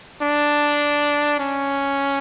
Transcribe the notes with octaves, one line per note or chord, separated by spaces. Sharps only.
D4
C#4